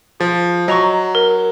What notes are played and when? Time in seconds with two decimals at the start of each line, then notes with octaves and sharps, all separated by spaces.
0.20 F3 G#4
0.68 F#3 D#5 A#5 C#6
1.15 A#4